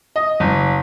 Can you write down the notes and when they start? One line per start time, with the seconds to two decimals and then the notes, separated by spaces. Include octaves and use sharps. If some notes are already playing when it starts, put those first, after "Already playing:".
0.16 D#5
0.40 F#1